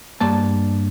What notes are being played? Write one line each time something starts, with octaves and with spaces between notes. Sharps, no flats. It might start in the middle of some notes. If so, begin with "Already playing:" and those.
G2 A#3 A5